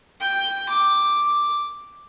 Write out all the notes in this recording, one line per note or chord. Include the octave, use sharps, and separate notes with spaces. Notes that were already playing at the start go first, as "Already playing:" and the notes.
G5
D6